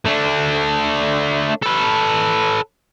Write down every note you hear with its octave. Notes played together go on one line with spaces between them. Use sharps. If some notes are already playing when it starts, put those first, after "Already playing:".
A3 D4
A4 B4